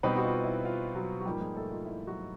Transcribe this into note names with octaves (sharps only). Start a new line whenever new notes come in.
B2 G3 B3 C4 D#4 B4
F#4
F4
E4
F4
F#3 F#4
F#4
G#2 F3 G3 A#3 G4
G#3 G#4
A3 A4
F4
E4
F#3 F#4